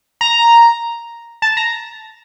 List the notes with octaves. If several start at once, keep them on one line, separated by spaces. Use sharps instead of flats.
A#5
A5
A#5